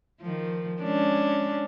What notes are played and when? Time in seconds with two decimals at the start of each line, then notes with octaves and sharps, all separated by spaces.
0.21 D#3 F3
0.82 G#3 C#4 D4